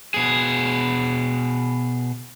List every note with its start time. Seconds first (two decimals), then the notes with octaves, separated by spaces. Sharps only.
0.14 B2 G#4